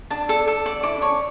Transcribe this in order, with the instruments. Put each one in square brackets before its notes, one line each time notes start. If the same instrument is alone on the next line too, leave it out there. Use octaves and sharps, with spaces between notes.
[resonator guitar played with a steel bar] D4 [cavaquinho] A5
[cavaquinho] A4
A4
D5
[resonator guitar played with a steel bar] E4 [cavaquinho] D6
[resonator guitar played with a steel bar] D4
[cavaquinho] C#5
[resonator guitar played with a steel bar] C#4